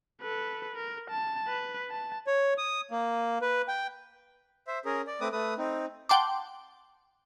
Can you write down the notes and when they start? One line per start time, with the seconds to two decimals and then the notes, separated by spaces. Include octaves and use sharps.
0.22 A4 B4
0.75 A#4
1.10 A5
1.48 B4
1.90 A5
2.27 C#5
2.58 D#6
2.91 A#3
3.42 B4
3.68 G5
4.67 C5 E5
4.85 C#4 G#4 A#4
5.07 D5
5.21 A3 C4 B4 D6 D#6
5.32 A3 B4 D#6
5.58 C4 D#4
6.09 F#5 G5 A5 C6 D6